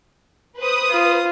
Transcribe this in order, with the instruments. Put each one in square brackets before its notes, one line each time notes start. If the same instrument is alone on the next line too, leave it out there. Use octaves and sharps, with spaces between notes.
[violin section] B4 C5 D#6
[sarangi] F4